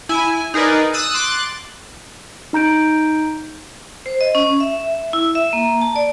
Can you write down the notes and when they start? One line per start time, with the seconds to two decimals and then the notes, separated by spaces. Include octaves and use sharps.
0.09 E4 G#5
0.54 D#4 G#4 A#4 B4 D5
0.93 D#6 E6 F#6 A6 D#7
1.14 C6 D6 F#6 A6
2.53 D#4 A#5 G6 D7
4.06 C5
4.21 D#5
4.35 C#4
4.60 E5
5.13 E4
5.35 E5
5.53 A#3
5.82 A5
5.96 D5